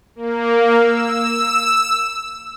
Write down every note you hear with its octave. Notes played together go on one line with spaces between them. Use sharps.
A#3
E6